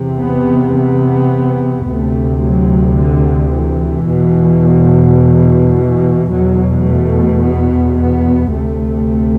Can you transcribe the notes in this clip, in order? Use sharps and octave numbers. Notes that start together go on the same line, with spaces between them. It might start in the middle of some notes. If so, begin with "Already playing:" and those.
Already playing: E2 C3
B3
B3
D2 C3 A3
F#3
D3
E3
E2 B2
E3
E3
E2 B2 F#3
A3
B3
B3
D2 C3 A3